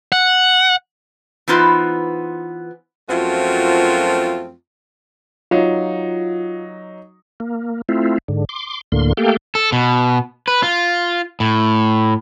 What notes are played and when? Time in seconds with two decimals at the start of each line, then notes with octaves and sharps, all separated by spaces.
0.12 F#5
1.48 E3 B3 D#4 F4 B4 C5
3.09 F#2 F3 A3 C4 F4 F#4
5.51 F#3 D#4 F4
7.40 A#3
7.89 A3 C4 E4 F4
8.28 G#2 D3
8.49 C6 D6
8.92 D2 A2 D3 A#3 C6
9.17 A3 A#3 G4 A4 F5 G5
9.55 A4
9.72 B2
10.48 B4
10.63 F4
11.40 A2